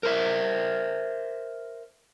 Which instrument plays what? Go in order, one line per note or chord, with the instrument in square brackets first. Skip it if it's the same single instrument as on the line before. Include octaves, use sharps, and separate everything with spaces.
[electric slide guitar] A#4 C5 E5